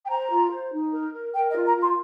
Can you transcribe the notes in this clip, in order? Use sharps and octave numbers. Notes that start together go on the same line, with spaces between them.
G5
C5 A#5
F4
C5
D#4
A#4
A#4
A#4 G5
D#5
F4
A#5
F4
C6